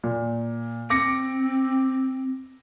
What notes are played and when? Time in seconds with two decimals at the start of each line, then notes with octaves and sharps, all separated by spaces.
0.03 A#2
0.90 C4 D6 A#6 C#7